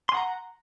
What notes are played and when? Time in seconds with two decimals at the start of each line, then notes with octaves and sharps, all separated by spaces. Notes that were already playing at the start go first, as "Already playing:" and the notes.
0.09 C6
0.12 G#5
0.14 F#5
0.17 A#5